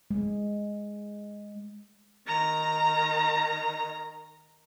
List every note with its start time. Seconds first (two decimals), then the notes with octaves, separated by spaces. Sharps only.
0.11 G#3
2.27 D#3 A#5